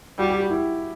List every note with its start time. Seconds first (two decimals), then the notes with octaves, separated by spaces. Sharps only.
0.19 G3 F#4
0.30 G4
0.40 F#4
0.50 E4